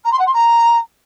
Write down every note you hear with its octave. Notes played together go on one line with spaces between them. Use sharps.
A#5
C6
F#5
C6
A#5